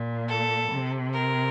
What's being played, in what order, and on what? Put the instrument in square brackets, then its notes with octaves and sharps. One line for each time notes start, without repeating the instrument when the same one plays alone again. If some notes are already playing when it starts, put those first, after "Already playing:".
Already playing: [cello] A#2
[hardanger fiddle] A4
[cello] C3
[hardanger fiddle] A#4